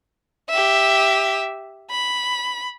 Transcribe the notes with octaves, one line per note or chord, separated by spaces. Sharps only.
G4 E5
B5